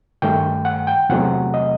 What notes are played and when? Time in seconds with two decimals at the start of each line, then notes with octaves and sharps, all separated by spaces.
0.22 G2 D#3 A3 G5
0.65 F#5
0.87 G5
1.09 E2 C3 F#3 A3 F#5
1.54 D#5